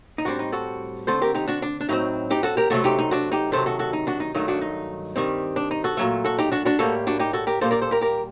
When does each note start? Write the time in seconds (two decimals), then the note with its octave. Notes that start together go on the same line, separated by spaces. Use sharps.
0.18 D#4
0.25 A2 G3 C4 D4 F#4
0.39 D#4
0.52 F#4 A4
1.07 D3 A3 C4 A4 C5
1.22 G4 A#4
1.35 D#4 G4
1.48 D4 F#4
1.62 D4
1.81 D4
1.89 A2 F#3 C4 D#4
2.31 D#4 G4
2.43 F#4 A4
2.57 G4 A#4
2.70 C3 F#3 A3 C4 F#4 A4
2.84 D#4 G4
2.99 D#4
3.11 D4 F#4
3.32 D#4 G4
3.52 C3 D#3 F#3 A4 C5
3.66 F#4 A4
3.79 F#4 A4
3.93 D#4
4.07 D4 F#4
4.20 D#4
4.34 G2 D#3 F#3 A3 D#4
4.48 D4 F#4
4.61 D#4
5.16 G2 D#3 G3 C4
5.56 D4
5.71 D#4
5.84 F#4 A4
5.97 A#2 F#3 A3
6.25 F#4 A4
6.38 D#4 G4
6.52 D4 F#4
6.65 D4 F#4
6.79 A2 G3 A#3 F#4 A4
7.07 D4 F#4
7.19 D#4 G4
7.33 F#4 A4
7.47 G4 A#4
7.61 A#2 G3 A#3 A4 C5
7.71 A#4 D5
7.82 A4 C5
7.91 G4 A#4
8.01 G4 A#4